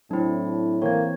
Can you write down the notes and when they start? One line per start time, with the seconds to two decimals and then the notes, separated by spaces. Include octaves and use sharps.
0.11 A2 F#3 C4 D4 E4
0.82 E3 A#3 C4 C#5 G#6